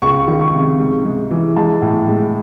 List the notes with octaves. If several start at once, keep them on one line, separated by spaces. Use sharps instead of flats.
C#2 C#6
D#3
C#6
C3
G#2
G#3
E3
G#3 A5
A2
G#3